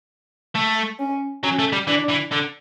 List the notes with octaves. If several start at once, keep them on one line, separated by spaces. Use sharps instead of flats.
A3
C#4
F#3 C#4
A3
G3
E3 D4
E3
D3